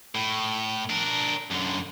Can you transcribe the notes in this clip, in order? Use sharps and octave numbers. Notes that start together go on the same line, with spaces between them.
A2
D4 A#4
F#2 D3